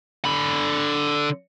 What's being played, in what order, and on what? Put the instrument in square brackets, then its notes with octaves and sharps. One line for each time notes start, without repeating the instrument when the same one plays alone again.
[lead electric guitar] D3 B5